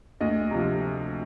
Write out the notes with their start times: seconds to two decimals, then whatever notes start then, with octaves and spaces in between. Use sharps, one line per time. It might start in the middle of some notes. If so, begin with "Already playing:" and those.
0.20 D2 D#5
0.51 C3 F3